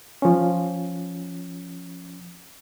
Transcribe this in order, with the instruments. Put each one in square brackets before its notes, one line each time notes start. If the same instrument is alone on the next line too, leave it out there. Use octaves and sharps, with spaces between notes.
[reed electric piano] F3 C#4